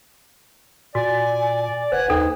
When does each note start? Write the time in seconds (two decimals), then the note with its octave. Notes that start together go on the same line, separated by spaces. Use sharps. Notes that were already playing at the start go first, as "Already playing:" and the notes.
0.95 A#2 F#4 D5 G#5
1.92 F#1 B4 C5 F#5 G#5
2.10 D#2 D4 D#4 A4